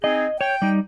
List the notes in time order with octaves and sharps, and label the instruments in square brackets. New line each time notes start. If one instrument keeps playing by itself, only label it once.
[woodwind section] C4 D#4 G#4 [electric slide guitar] D#5
[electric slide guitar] C#5 [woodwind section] G5
[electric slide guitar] G3 D#4